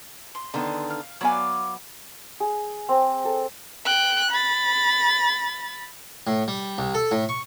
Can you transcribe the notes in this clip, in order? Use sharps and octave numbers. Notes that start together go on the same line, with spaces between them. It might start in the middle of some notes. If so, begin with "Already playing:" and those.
C6
D3 D#3 B3 C6
F5
F#3 B3 D5 F5 G#5
G#4
C4
A4
G5 F#6
B5 A6
A2
G3
C2
A4
A2
C#6